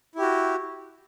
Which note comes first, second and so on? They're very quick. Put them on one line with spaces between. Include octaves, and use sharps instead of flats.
E4 G4 F#4